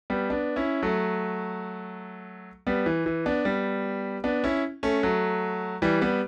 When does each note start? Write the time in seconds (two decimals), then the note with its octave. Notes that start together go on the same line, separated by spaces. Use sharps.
0.10 G3 B3
0.30 B3 D4
0.56 C#4 E4
0.82 F#3 A3
2.67 G3 B3
2.86 E3
3.06 E3
3.26 B3 D4
3.45 G3 B3
4.24 B3 D4
4.44 C#4 E4
4.83 A3 C#4
5.03 F#3 A3
5.82 E3 G3
6.01 G3 B3